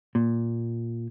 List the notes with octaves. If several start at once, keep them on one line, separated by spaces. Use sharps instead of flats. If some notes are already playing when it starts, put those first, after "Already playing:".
A#2